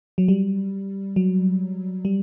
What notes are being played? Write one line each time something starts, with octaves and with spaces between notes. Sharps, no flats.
F#3
G3
F#3
G3